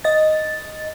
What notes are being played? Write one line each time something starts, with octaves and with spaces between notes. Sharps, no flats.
D#5 A6